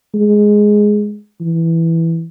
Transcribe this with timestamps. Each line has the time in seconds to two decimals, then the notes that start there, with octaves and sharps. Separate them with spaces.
0.14 G#3
1.40 E3